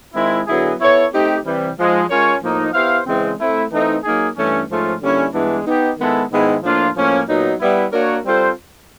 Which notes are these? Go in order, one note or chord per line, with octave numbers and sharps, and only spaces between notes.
D#3 G#3 C4 E4
D3 F#3 B3 E4 G#4
B3 E4 A4 C#5
A3 C4 D#4 G4
C3 E3 G3
G#2 F3 G#3
G#3 C#4 F4 A#4 C#5
A2 F3 A#3 D#4
B3 E4 G4 C5 F5
C#3 E3 G#3 C4
A3 C4 E4
E3 A3 C4 D#4
F#3 A#3 D#4 G#4
G2 E3 A3 C#4
G#2 F3 A3 C#4 F4
D3 G3 A#3 C#4 E4
G2 E3 G#3 B3 D4
B3 D#4 G4
D#3 G#3 B3 E4 A4
G#2 D#3 G#3 B3 E4
A2 F3 A#3 D4 F4
A2 F3 A#3 C#4
A#2 F#3 B3 D#4
G3 B3 E4
A#3 D4 F#4 A#4 C#5
G3 C4 F4 A4 C5